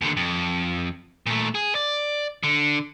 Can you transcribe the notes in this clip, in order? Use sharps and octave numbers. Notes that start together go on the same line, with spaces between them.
D#2 D3
F2
A#2 A3
G#4
D5
D3